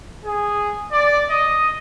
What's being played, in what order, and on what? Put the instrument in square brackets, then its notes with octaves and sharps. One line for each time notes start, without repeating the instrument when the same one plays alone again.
[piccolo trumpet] G#4
D5
D#5